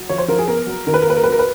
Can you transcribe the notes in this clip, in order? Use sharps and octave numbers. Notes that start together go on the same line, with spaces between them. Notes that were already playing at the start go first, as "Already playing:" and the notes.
Already playing: F#3
F3 C#5
C5
F3 A#4
G#4
B3 A#4
F#3
D#3 A#4
B4
A#4
A#3 B4
A#4
B4
F#3
A#4
B4